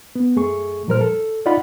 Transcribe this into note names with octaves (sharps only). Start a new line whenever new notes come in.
B3
F#2 A3 G#4 C#6
A#2 F3 G3 A#4 C5 F6
A4
D#4 F4 D5 D#5 F#5 B5